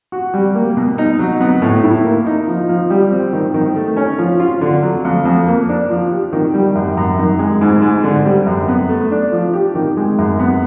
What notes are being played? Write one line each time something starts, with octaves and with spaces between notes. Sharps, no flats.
F#4
G3
A#3
B2
D#4
F#3
B3
A2
E4
A#3
D#4
F3
F3
G3
C4
D#3
D#3
A3
C#4
F3
F4
D3
F#3
F2
F2
A#3
D4
F3
G4
D#3
G3
F#2
F#2
D#3
G#3
G#2
G#2
D3
G3
F#2
B3
A3
D4
F3
G4
D#3
G#3
F#2
B3